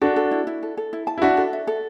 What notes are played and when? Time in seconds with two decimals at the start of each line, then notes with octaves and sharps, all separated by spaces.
0.02 D4 F#4 A4
0.16 A4
0.31 E4
0.47 E4
0.63 A4
0.77 A4
0.93 E4
1.07 A5
1.18 E4
1.22 D4 F#4 E5
1.37 A4
1.53 E5
1.67 A4